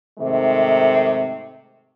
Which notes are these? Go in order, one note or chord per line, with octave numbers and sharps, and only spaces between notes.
G#2 C3 D#3 A3